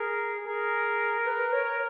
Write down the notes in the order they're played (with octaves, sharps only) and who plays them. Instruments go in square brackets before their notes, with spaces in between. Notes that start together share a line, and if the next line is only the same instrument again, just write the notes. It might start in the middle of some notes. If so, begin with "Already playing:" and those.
Already playing: [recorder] G#4 [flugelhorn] A#4
[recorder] G#4 [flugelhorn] A#4
[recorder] B4
C#5